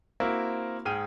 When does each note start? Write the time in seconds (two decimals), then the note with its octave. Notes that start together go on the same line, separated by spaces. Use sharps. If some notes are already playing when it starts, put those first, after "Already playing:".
0.20 A#3 C4 E4 F#4 A#4
0.85 G#2 G#4 G5 F6 D#7